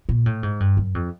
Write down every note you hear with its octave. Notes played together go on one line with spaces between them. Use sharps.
A#2
A2
G#2
G2
F#2
F2